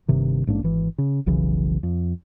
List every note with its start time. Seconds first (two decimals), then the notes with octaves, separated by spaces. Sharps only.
0.08 G1 G2 C3 D#3
0.47 A1 G#2 A#3 D4
0.63 G#1 E3
0.98 C#3
1.26 F1 B1 C#3 E3
1.83 F2